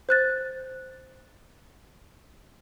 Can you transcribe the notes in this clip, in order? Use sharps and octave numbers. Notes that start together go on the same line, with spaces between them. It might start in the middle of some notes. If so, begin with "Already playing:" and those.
C5 F#6 A6